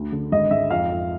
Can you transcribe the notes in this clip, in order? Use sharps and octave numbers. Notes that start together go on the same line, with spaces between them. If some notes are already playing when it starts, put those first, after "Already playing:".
Already playing: D2
D3
G#1 D#5
G#2 E5
F2 F5
F2